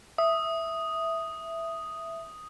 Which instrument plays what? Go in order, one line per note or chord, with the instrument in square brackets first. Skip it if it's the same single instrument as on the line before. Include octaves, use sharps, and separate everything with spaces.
[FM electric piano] E5 [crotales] D#6